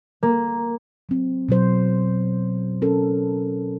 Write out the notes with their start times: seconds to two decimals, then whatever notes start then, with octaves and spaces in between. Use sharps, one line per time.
0.23 A#3
1.09 F#3 C4
1.48 B2 F#3 C5
2.82 C#4 A4 A#4